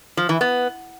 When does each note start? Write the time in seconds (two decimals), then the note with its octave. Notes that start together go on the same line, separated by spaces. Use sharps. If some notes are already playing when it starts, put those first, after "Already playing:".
0.17 F3
0.29 E3
0.41 B3